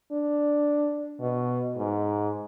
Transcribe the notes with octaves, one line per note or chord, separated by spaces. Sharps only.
D4
B2
G#2